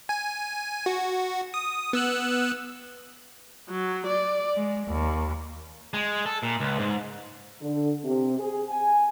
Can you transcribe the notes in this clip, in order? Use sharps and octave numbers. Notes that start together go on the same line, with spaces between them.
G#5
F#4
D#6
B3 E6 F#6
F#3
D5
G#3
D#2
G#3
A4
A#2
C#2
G#2
D3
C3
G#4
G#5